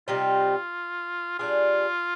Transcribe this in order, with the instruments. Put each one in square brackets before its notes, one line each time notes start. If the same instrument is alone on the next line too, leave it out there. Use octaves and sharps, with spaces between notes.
[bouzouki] C3 G3 C4 D#4 [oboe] F4
[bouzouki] G3 D4 G#4 [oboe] F4